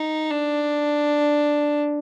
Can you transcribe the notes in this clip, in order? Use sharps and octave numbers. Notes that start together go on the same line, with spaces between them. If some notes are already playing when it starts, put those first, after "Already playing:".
Already playing: D#4
D4